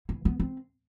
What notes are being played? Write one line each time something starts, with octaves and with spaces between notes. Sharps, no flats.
E3
B3
C4